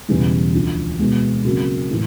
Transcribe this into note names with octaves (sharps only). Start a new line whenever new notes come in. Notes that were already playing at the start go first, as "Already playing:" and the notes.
E1 E2 C#3 E3 G3
D2 D3 F3
B2 G#3 B3
F2 C#3 F#3 A#3
A2 E3